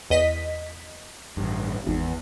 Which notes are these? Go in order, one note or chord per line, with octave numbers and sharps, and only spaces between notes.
E2 D#5 B6
A1 G2
G#1 E2